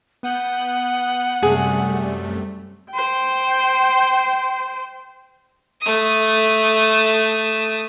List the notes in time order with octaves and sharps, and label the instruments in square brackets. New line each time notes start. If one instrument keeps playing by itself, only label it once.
[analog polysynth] B3 D#6 G6 [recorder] F#5
[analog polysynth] F#2 C3 A3 [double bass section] G3 [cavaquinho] G#4
[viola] C5 G5
[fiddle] A3 D#6